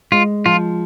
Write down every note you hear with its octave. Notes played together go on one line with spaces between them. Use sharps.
G#3 F4
F3 F4